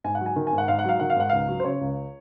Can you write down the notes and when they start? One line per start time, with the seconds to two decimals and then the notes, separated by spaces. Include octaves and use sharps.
0.04 G#2 G#5
0.15 F#5
0.20 F#3
0.26 G#5
0.36 D#3
0.47 G#5
0.53 G#2
0.58 F#5
0.68 G#2 F5
0.79 F#5
0.85 F#3 F5
1.00 D#3 F#5
1.10 F5
1.16 G#2 F#5
1.29 C#2 F5
1.48 F#3
1.60 C5
1.64 C#3 C#5
1.81 C#2